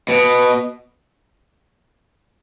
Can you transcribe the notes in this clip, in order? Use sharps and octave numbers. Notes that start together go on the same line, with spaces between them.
B2